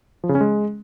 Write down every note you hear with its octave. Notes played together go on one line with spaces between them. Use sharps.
F3
C#3
C#4
G#3